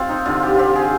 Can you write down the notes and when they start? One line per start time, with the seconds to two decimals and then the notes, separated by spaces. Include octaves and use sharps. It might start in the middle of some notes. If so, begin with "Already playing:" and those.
Already playing: C4 F4
0.09 D#4
0.25 D3 F4
0.43 G4
0.55 C4 F4 G4
0.75 G#4